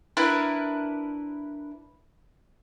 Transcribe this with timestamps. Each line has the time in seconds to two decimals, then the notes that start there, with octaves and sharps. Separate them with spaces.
0.17 D4 E4 A#4 B4